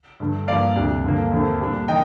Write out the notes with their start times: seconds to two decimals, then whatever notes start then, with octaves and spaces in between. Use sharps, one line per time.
0.20 G2 D3 A3
0.47 G2 F3 A#3 D5 F5
0.75 D2 C3 G3 D4
1.04 G2 D3 F3 A#3
1.31 D#2 D3 A3 C4
1.60 A#2 G3 D4
1.88 D#3 D#5 G5